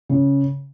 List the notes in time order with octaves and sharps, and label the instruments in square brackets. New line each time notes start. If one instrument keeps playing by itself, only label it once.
[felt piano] C#3